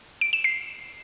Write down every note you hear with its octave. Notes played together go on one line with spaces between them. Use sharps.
D7
E7
C7